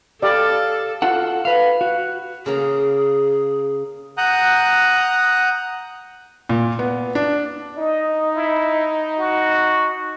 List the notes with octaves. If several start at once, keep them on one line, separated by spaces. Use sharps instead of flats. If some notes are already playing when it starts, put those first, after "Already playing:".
G4 A4 D5 F5
F4 F#4 A4 F#5
B4 F5
F#4
C#3 A#3 G#4 A#5
F#5 A#5 D#6 F#6 G6
A#2
B3
D4
D#4 D#5
E4
F#4